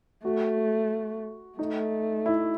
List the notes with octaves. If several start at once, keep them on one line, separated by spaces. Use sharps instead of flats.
A3 F#4
A3 D#4
E4